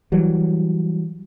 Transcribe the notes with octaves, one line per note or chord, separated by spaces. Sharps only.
E3 F#3 G3